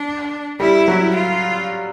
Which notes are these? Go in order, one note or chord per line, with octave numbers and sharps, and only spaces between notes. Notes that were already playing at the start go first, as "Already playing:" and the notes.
Already playing: D4
G3 E4
F#3
F4